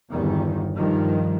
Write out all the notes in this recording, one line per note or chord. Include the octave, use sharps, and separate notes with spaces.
G1 E2 D#3
G2 D#3 F3